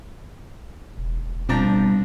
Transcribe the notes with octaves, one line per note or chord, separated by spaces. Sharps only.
E1
B2 F3 G3 C4 D4 A#5